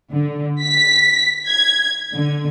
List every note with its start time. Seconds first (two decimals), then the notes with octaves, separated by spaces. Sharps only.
0.11 D3
0.62 B6
1.47 G#6
2.14 D3